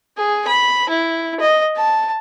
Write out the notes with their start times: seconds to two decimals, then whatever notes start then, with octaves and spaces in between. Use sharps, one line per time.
0.17 G#4
0.47 B5
0.89 E4
1.40 D#5
1.77 A5